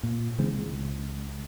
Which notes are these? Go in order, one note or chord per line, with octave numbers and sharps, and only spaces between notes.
A#2
C#3 E3 G#3 C4
C#2